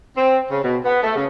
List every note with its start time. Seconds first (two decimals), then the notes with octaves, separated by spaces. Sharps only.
0.17 C4
0.51 C#3
0.63 B2
0.85 B3
1.02 A3
1.15 C#3